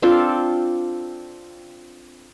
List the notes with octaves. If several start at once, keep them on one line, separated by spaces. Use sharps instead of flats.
C4 D4 F4 A4